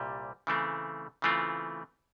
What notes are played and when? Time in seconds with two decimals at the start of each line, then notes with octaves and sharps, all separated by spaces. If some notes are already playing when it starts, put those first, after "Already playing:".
Already playing: C2 A#2 G3
0.47 C#3 E3 A3 C4
1.22 C#3 E3 A3 C4 F4